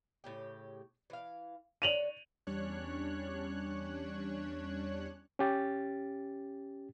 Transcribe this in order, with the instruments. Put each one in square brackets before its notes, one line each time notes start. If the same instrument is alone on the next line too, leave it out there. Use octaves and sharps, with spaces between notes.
[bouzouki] A2 C#3 G4
E3 F5
[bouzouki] D3 C#5 [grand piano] D#7 F7 F#7
[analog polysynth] E2 G3 C#4 D4 C#5 F#6
[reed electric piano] C#4 G4 A6